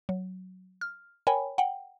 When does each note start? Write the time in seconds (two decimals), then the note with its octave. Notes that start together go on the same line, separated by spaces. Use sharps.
0.09 F#3
0.81 F6
1.27 A#4 C#5 G5 G#5 B5
1.58 F#5 G5